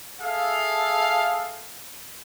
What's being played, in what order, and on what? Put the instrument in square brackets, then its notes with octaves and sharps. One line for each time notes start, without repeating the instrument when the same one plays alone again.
[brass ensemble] G#4 A4 E5 F5